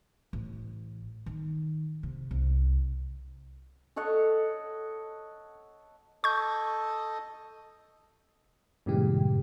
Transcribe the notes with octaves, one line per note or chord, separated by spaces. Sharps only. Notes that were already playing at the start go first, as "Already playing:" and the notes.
A1
D#3
C3
C2
A4 C#5 D#5 F#5
A4 D#5 C#6 G6
G2 A#2 C#3 E3 G#3 G4